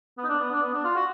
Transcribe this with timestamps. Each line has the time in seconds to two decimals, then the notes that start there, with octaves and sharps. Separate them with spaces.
0.18 B3
0.24 D#4
0.28 D4
0.40 B3
0.51 D4
0.62 B3
0.73 D4
0.84 F4
0.95 F#4